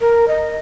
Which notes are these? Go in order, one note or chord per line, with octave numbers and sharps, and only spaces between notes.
A#4
D#5